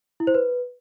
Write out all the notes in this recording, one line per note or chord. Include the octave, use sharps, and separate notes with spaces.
E4
C5
B4